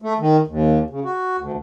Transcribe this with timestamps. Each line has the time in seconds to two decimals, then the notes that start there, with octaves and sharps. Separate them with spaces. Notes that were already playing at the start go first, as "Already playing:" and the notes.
0.02 A3
0.19 D#3
0.48 D#2
0.90 C#3
1.04 F#4
1.38 D2